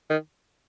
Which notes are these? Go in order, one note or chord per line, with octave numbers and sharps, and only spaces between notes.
D#3